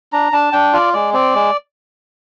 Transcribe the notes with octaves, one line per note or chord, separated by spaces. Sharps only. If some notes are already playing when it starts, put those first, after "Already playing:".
D4 A#5
D4 A5
D4 G5
F4 D5
G#3 D5
C4 D5
G#3